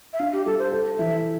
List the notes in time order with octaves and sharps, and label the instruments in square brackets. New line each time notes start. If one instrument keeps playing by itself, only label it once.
[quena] E5
[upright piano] D4 [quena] F5
[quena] G4
[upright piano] G3 [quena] A4
[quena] C5
[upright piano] A4
[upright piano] E3 [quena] E5